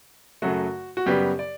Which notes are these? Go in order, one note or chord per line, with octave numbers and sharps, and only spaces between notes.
F#2 C#3 F#3 A3 F#4
F#4
F#2 C#3 G3 B3 G4
D5